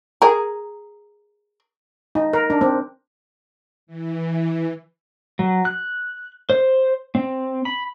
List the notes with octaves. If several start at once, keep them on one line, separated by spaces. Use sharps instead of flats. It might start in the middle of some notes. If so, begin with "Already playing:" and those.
G#4 A#4
D#4
A#4
D4
C4
E3
F#3
F#6
C5
C4
B5